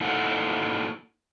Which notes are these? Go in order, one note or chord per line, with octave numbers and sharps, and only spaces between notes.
A#3 D#4 E4 F#4 A4 F#5